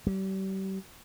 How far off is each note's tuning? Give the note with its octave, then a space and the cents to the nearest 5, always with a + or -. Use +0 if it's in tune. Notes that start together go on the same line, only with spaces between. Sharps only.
G3 -35